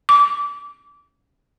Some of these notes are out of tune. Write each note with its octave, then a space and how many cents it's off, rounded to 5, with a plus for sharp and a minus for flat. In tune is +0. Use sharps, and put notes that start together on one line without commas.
D6 -25